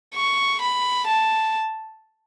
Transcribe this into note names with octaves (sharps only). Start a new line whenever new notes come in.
C#6
B5
A5